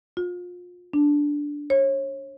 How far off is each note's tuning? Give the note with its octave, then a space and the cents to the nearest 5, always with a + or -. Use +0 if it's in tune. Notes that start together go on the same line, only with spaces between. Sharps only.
F4 +30
D4 -5
C#5 -30